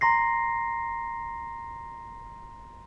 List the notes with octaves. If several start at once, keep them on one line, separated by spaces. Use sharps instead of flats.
A#5 C6 A#6 C7